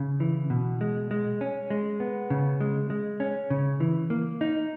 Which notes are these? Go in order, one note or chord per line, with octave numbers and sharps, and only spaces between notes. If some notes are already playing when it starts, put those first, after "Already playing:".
Already playing: C#3
E3
B2
G#3
G#3
C#4
G#3
B3
C#3
G#3
G#3
C#4
C#3
E3
A#3
D#4